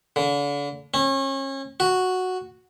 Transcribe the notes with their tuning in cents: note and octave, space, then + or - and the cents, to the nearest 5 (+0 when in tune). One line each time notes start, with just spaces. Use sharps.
D3 -40
C#4 -35
F#4 -5